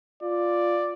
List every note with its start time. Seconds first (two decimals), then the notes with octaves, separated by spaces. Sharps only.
0.23 F4 D5